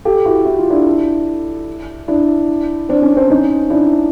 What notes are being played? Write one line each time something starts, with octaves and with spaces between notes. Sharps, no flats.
G4 A4
E4 F#4
E4
F4
D4 E4
D4 E4
C4 D4
C#4
C4 D4
C#4 D#4
D4 E4